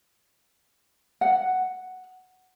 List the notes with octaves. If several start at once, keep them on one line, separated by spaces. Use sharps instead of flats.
F#5